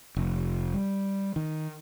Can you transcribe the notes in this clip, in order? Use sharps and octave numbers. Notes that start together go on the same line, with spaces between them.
F1
G3
D#3